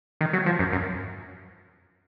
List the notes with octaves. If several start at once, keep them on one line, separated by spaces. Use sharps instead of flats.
D#3
F#3
F3
F#2
F#2